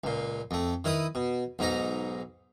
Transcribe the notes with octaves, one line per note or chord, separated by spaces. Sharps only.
C#2 A#2
F2 A3
D#3 E4 B4 D#6
B2
B1 G#2 D#4 A#5